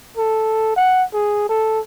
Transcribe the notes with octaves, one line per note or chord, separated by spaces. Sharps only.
A4
F#5
G#4
A4